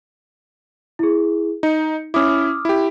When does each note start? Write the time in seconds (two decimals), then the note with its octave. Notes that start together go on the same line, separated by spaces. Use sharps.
0.99 E4 G#4
1.63 D#4 C#7
2.14 C#4 E4 D6 D#6 F6
2.65 E4 G4